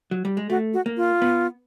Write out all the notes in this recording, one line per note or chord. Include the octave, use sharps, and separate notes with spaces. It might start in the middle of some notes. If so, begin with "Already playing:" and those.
F#3
G3
G#3
A3 F#4
F#4
A#3
F4
B3